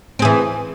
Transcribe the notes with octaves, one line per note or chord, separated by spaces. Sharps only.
E3 C4 G#4